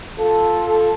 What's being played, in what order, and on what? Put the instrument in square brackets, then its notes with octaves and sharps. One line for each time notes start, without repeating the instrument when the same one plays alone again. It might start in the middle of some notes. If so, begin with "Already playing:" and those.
[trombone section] F4 A4